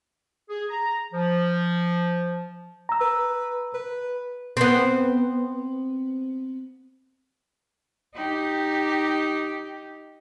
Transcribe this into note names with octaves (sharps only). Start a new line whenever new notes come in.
G#4
A#5
F3
A#5 E6
B4
B4
B3 C4
D#4 G4